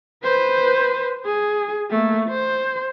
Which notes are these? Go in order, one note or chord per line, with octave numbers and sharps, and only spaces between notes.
B4 C5
G#4
A3 A#3
C5